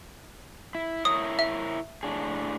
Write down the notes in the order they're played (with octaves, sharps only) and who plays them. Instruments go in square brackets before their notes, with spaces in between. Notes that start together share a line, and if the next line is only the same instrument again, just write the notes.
[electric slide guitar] E4
[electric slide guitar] E4 A#4 C#5 [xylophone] D#6
[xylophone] E5
[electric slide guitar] A2 D4 G#4